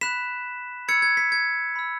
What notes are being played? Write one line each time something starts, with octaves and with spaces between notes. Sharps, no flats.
B5 F#6 B6 E7
B5 E6 G#6 C#7
G#6
B6
G#6
B5 E6